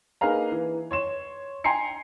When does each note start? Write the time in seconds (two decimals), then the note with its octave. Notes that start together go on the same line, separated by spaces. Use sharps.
0.21 A#3 D#4 G#4 B4 F5 A#5
0.52 E3
0.91 C#5 C6 E7
1.64 G5 G#5 A#5 C6 C7 C#7